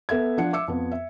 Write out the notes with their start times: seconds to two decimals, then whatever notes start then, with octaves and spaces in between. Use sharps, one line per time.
0.09 B3 A4 E5 G#6
0.38 F3 D4 F#5 C#7
0.53 E5 D6 E6 C#7
0.68 F2 B3
0.91 E5